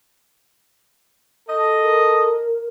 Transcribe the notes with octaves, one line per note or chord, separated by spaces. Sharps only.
A4 D#5
A#4